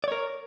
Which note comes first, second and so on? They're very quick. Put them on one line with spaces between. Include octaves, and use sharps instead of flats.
D5 C#5 A#4